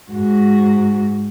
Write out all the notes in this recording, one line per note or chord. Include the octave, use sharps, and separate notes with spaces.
G#2 F#4